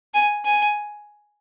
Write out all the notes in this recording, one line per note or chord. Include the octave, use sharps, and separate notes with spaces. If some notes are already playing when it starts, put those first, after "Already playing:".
G#5
G#5